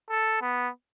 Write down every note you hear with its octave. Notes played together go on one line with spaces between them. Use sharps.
A4
B3